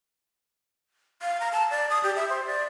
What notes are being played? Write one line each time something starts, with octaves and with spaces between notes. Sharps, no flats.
F5
A#5
A5
D5
D#6
G4
E5
C5
D5